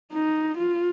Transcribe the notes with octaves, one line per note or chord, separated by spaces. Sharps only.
D#4
F4